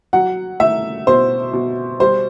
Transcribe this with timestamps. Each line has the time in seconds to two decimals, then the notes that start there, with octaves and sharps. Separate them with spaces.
0.13 F#3 F#5
0.60 A3 E5
1.07 B2 C5
1.53 B2
2.00 G3 C5